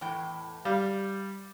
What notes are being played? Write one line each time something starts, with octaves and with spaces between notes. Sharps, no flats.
E2 A2 G5
G3 F5